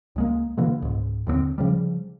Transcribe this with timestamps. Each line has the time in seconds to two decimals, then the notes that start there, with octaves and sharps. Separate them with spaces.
0.16 C#2 G#3 A#3
0.57 B2 D3 E3 A#3
0.82 C#2 G#2
1.27 D#2 D3 A3 C4
1.58 C#3 F3 G3